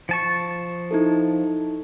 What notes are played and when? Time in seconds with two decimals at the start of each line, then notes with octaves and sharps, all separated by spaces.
0.09 F3 A5 C#6
0.91 D#4 E4 A4